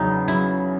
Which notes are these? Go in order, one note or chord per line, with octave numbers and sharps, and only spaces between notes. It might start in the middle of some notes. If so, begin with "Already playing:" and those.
Already playing: E2 C#3 F#3 D#4
F#3 E4